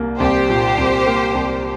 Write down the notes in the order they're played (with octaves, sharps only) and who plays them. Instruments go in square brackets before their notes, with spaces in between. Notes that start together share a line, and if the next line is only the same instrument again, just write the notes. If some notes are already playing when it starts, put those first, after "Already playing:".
Already playing: [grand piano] C2 A#3
[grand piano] C2 [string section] G4 C5
[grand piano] A#2
C2
A#3
C2